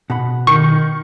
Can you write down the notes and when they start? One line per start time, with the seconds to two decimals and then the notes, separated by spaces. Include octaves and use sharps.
0.10 B2 F#5 B5
0.47 D#3 C#6